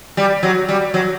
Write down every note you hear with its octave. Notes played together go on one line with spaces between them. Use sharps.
G3
F#3
G3
F#3